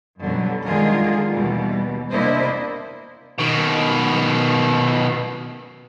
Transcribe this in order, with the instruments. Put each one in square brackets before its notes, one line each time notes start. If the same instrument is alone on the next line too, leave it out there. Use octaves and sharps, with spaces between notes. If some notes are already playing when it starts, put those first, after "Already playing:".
[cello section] F#2 B2 D3 F#3 G3
D3 D#3 G#3 F4 G#4 A#4
D#2 B2 E3 G3
C3 A#3 D4 E4 C5 D#5
[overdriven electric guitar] B2 D#3